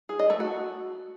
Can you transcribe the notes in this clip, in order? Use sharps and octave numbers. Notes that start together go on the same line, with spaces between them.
G#4
D#5
A3
F#4